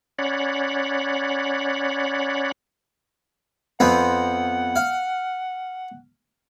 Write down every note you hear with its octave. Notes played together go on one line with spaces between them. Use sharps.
C#4 C#5 D5 F#5 B5
F2 B3 C4 F#5
F5